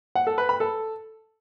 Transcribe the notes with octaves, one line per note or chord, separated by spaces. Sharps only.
F#5
A4
B4
B5
A4